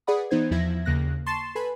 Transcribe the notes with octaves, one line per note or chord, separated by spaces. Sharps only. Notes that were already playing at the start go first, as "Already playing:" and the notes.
G#4 B4 D5 F#5 B5 D#6
E3 B3 D#4 C5 G#6
E2 F3 E4 E5 G#6 A#6
D#2 C#3 A#3 F#6 A#6
A5 C6 C#6 A6 C7 E7
A4 B4 G#5 B5